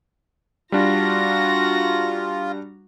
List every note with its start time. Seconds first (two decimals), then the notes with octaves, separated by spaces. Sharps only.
0.72 G3 D4 F4 F#4 A#5 A#6